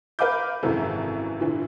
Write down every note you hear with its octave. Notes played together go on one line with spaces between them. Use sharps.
A#4 B4 F5 B5 D6 G6
G#1 F#2 C3 E3 A4
A#2 D3 E3